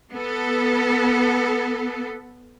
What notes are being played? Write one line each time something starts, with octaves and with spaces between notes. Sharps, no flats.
B3 A4